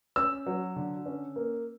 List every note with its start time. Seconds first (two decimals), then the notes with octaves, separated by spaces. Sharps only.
0.16 C#4 E6
0.46 F#3
0.76 D3
1.06 C#4
1.36 A#3